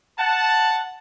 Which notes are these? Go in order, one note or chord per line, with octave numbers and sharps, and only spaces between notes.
F#5 A5